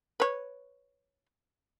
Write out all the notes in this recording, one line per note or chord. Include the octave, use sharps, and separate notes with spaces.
B4 C#5